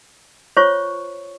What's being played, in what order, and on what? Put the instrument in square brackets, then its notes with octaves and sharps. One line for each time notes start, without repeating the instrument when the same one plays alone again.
[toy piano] F4 C5 C#5 C#6